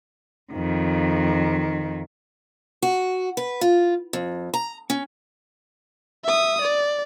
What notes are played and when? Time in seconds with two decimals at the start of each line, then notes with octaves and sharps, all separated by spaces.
0.53 F2 D#3
2.82 F#4
3.37 B4
3.61 F4
4.13 F2
4.54 A#5
4.90 C#4
6.24 E5 D#6
6.62 D5